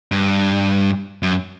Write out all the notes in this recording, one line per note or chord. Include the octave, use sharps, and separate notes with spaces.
G2
F#2